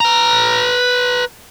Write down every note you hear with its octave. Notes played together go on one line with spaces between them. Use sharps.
B4 A#5